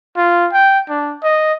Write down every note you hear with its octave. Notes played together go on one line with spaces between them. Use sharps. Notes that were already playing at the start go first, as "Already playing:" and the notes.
F4
G5
D4
D#5